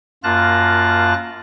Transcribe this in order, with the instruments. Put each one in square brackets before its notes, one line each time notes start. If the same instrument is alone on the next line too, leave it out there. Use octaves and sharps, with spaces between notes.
[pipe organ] F#2 A#3 F4 A5 F#6 A#6